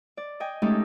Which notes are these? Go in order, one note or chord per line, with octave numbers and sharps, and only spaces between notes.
D5
D#5 G5 G#5
G#3 A3 C#4 D#4 G4 A4